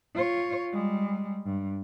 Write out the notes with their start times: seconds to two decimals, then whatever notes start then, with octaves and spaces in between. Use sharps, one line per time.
0.15 F4 C#5
0.72 G3 G#3
1.46 G2